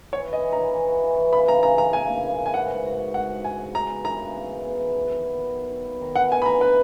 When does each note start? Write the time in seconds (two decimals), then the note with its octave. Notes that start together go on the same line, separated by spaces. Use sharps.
0.13 E3 C#5
0.28 E3 D#5
0.42 E3
0.53 E3 A#5
0.73 E3
0.88 F#4
1.03 E3
1.18 E3
1.33 C#3 B5
1.48 C#3 A#5
1.63 C#3 A#5
1.78 E3 A#5
1.93 A#3 G#5
2.09 A#3
2.24 C#3
2.39 E3
2.46 G#5
2.54 G#2 F#5
2.69 G#2
2.85 F#4
2.99 F#4
3.14 G#2 F#5
3.30 F#4
3.44 G#2 G#5
3.60 F#4
3.74 G#3 A#5
3.89 B3
4.05 E3 A#5
4.20 C#3
4.35 C#3
4.51 E3
4.66 B3
4.80 E3
4.95 F#3
5.11 D#3
5.25 B3
5.40 F#3
5.55 F#3
5.71 D#3
5.85 B3
6.01 D#3
6.16 E3 F#5
6.32 B3 G#5
6.42 B5
6.46 E3 A#5
6.61 E3 B4